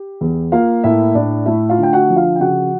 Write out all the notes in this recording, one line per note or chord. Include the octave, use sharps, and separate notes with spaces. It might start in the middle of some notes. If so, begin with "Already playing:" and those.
Already playing: G4
E2
A#3 F4 F5
A2 E4 E5
A2 D4 D5
A3 E4 E5
F4 F5
D3
G5
F#4 F#5
F3
F4 F5
G5
C#3 F#4 F#5